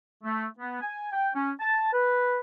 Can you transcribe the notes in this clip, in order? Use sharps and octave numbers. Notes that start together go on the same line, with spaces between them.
A3
B3
G#5
G5
C#4
A5
B4